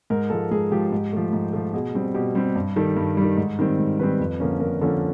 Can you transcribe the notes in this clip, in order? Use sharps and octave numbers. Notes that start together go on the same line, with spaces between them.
G#2 A#4
F3 G#3 A4
G#2 G#4
F3 G#3 G4
G#2
F3 A3
G#2
F3 A3
B2 G#4
G3 C4
B2 G4
G3 C4
G2
D#3 G3 A4
G2
D#3 G3
G#2
D#3 G3 C4
G#2
D#3 G3 C4 B4
F2
D3 F3 A#3 C#4
F2 A#4
D3 F3 A#3 C#4 A4